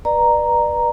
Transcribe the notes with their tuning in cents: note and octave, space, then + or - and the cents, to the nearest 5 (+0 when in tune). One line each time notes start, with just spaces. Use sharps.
B4 -20 D5 +25 A#5 +0